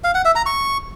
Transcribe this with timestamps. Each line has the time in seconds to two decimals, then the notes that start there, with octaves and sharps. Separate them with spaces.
0.04 F5
0.14 F#5
0.25 E5
0.35 A#5
0.46 C#6